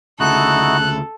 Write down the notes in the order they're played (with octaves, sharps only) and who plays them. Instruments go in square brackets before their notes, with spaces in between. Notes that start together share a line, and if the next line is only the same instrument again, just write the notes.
[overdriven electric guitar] D2 C#3 [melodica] D#4 E4 F#4 [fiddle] A4 [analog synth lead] F#6